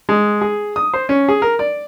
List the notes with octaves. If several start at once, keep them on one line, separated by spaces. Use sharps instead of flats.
G#3
G#4
D#6
C5
C#4
G#4
A#4
D5